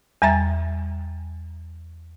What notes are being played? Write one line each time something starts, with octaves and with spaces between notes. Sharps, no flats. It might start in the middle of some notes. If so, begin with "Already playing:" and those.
E2 G3 E5 A#5 A6